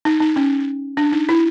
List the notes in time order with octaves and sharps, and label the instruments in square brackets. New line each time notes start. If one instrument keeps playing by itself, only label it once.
[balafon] D#4
D#4
C#4
D4
D#4
E4